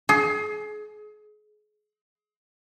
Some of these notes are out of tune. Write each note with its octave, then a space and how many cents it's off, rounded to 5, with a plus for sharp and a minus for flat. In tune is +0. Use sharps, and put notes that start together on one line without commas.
G#4 +30